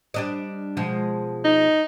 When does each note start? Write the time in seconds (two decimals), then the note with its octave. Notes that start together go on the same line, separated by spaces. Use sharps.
0.14 G3 D4 D#5
0.77 B2 F3 G#3
1.45 D#4